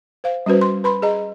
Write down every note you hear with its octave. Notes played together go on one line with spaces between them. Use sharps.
C5 F5
G3 C#4 F#4 B4 C5
C6
B4 B5 C6
G#4 D#5 A#5